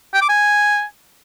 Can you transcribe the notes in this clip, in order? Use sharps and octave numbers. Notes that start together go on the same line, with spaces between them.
G5
D6
G#5